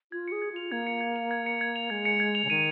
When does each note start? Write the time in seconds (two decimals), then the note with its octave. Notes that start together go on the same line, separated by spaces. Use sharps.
0.12 F4 G#6
0.28 G#4 C#7
0.42 G#6
0.52 F4 F7
0.71 A#3 G#6
0.87 C#7
1.01 G#6
1.16 F7
1.31 G#6
1.46 C#7
1.61 G#6
1.76 F7
1.90 G#3 G#6
2.05 C#7
2.20 G#6
2.35 F7
2.45 C#3
2.50 D#3 D#7